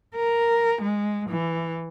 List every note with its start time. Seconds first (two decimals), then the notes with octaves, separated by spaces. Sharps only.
0.15 A#4
0.82 G#3
1.30 E3